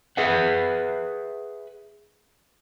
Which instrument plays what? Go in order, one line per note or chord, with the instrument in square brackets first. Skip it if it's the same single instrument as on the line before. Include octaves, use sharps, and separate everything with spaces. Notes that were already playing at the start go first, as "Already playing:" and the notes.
[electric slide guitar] G#4 B4 E5 F#5